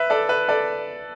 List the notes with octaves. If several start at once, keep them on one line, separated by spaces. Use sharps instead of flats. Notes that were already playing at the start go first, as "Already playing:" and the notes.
Already playing: B4 E5
A4 D5
B4
A4 D5